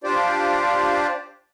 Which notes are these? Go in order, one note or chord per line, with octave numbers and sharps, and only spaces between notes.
D4 F4 G4 C5 D5